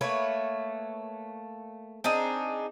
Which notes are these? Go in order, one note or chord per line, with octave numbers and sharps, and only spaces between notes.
A3 A#3 B4 C#5
C4 D4 D#4 G#4